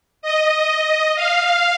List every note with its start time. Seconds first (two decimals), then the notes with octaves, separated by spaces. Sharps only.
0.22 D#5
1.15 F5